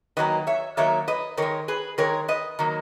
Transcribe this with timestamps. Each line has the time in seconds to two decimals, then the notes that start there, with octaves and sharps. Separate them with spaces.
0.17 D#3 F#3 A#3 B4 D#5
0.47 C#5 E5
0.77 D#3 F#3 A#3 C#5 E5
1.08 B4 D#5
1.37 D#3 G#3 A#4 C#5
1.68 G#4 B4
1.98 D#3 G#3 A#4 C#5
2.28 B4 D#5
2.59 D#3 F#3 A#3